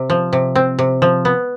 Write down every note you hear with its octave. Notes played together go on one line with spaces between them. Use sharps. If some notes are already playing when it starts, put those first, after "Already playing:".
Already playing: C3
F3
C3
C4
C3
F3
B3